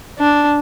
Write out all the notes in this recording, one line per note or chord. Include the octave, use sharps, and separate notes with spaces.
D4